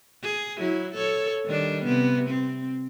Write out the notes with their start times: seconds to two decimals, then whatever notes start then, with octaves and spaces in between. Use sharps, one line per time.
0.23 G#4
0.58 F#3 E4
0.94 A4 C#5
1.46 D#3 G3 D4
1.85 C3 B3
2.29 C4